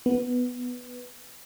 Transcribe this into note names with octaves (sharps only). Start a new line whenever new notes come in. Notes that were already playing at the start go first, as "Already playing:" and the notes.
B3